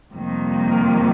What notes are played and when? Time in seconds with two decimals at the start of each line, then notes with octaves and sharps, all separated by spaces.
0.12 F2 C3 D#3 G3 A#3
0.70 A#4